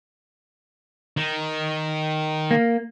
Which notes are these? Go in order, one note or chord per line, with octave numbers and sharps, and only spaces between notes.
D#3
A#3